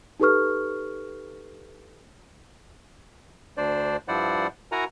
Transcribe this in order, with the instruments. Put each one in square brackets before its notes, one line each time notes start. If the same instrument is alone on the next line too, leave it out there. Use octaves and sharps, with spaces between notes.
[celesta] D#4 G4 A4 B4 C#6 F6
[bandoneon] D2 D4 C5 D5
G2 F3 E4 C5 D5 F#5
E4 F#4 A#4 F#5 G#5 A#5